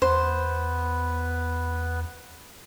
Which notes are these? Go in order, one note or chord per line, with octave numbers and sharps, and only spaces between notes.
E2 B3 B4 C5